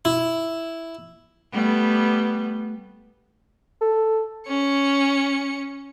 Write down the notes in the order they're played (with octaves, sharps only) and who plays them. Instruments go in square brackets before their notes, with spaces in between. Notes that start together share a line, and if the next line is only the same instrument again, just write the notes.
[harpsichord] E4
[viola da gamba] G3 A3 B3
[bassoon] A4
[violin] C#4 C#7